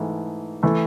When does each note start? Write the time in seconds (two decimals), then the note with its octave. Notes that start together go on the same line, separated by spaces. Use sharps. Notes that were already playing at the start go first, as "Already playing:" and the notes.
Already playing: G#2 E3 A3
0.63 E3 A3